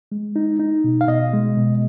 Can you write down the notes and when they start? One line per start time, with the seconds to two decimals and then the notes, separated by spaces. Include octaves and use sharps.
0.12 G#3
0.36 D#4
0.59 D#4
0.84 B2
1.01 F5
1.08 B2 D#5
1.33 G#3
1.57 B2